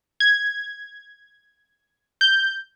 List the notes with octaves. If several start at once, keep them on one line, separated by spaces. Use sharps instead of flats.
G#6
G6